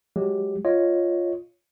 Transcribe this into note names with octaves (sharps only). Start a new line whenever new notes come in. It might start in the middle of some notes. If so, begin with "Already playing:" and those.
F#3 G#3 G4
F4 C#5 D#5